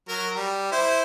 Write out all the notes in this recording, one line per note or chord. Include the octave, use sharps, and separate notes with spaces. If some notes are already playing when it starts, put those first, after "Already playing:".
F#3 A#4
G3
E4 C5